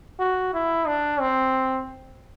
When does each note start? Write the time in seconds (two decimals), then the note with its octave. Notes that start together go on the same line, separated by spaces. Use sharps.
0.20 F#4
0.54 E4
0.87 D4
1.20 C4